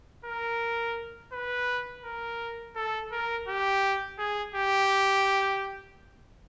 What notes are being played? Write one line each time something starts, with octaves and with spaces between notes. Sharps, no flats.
A#4
B4
A#4
A4
A#4
G4
G#4
G4